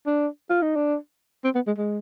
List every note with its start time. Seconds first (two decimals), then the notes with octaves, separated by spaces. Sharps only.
0.06 D4
0.50 F4
0.62 D#4
0.76 D4
1.44 C4
1.55 B3
1.67 G#3
1.78 G#3